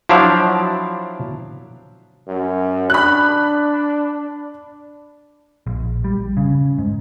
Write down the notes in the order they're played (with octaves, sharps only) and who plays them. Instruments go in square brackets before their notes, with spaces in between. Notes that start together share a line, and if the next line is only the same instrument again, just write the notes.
[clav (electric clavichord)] F3 F#3 D4 E4 D5 F5
[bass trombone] F#2
[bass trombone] D4 [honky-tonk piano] B5 F#6
[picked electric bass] A#1
G3
C#3
G#2